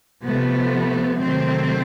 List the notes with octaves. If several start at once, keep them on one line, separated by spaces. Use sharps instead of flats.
C3 F3 A3 B3
C3 D#3 F#3 A3 C4